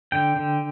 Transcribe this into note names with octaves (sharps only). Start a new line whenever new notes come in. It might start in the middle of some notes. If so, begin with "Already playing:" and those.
D3 G5
D3